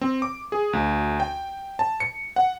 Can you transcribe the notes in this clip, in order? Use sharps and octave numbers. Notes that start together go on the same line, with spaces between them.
C4
D6
G#4
D2
G5
A5
C#7
F#5